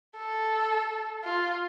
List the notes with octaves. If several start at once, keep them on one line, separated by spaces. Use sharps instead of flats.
A4
F4